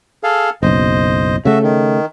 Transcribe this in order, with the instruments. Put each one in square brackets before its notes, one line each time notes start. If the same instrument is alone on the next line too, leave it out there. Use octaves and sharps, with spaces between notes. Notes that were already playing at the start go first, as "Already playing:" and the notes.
[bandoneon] G#4 A4 F5
[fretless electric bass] F#1 B1 [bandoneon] C5 D#5
[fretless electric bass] C#3 A3 [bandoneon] F#4 E5
[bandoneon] D#3